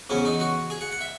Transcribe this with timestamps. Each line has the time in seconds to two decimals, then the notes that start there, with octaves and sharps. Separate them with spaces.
0.10 E2 C#3 F#3 C#4
0.25 D#4
0.40 F#4
0.70 G#4
0.81 F#5
0.91 F#5
1.01 E5